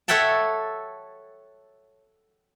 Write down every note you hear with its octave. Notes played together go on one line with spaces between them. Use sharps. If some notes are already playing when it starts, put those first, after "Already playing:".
A4 C#5 E5 F#5 G5 A5